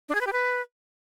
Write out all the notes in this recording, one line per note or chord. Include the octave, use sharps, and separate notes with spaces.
D4
G#4
B4
G4
B4